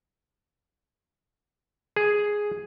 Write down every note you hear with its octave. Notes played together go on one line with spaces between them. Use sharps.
G#4